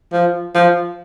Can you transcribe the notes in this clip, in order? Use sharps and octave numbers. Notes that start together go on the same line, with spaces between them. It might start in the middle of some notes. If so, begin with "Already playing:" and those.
F3
F3